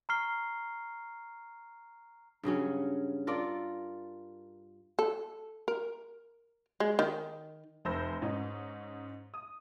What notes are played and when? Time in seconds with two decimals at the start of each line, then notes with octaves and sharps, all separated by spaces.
0.09 A#5 C#6 F6 C7 G7
2.43 G2 C#3 F#3 C#4
3.27 F4 A4 A#4 D5
4.99 A4
5.68 A#4
6.80 G#3
6.99 D#3
7.85 F1 C5 B5 E6 A#6
8.22 G#2 C#4 D#4
9.34 D#6